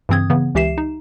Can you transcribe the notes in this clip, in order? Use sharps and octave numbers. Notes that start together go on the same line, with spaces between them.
G2 C#3 E3 C4 D#6 G#6
C#3 E3 B3
C#2 E3 G4 E5 C7 E7
D#4